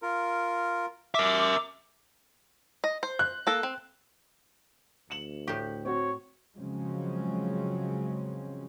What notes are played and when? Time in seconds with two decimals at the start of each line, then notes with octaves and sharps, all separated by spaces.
0.02 F4 A#4
1.14 A#4 E5 D6 E6
2.84 D#5
3.03 C5
3.19 F#6
3.47 A#3 A4
3.63 C4
5.10 D2 C#7 E7 F#7
5.48 A2 G4
5.85 C4 F#4 C#5
6.58 C#3 F3 F#3 G#3 C4 C#4